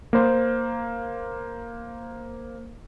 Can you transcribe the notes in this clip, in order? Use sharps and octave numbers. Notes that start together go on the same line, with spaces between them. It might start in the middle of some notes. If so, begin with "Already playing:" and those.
A#3 C5